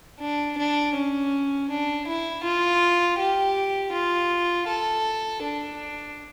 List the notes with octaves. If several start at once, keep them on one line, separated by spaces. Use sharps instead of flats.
D4
D4
C#4
D4
E4
F4
G4
F4
A4
D4